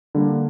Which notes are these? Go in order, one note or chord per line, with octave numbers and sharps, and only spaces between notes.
D3 G3 A#3 D4